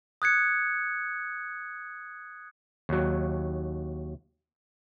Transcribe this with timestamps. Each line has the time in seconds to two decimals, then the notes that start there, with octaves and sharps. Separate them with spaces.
0.22 D#6 F#6 G#6 C#7
2.89 D#2 F#3